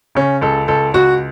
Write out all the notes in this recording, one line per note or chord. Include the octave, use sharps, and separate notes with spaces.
C#3 C#4
C#2 A4
C#2 A4
C#2 F#4